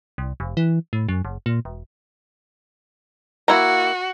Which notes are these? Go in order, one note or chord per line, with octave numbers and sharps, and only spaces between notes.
C2
F1
E3
A2
F#2
F#1
A#2
E1
A#3 E4 F#4 A#5